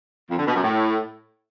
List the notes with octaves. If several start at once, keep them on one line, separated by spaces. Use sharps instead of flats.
F2
D3
B2
F#2
A2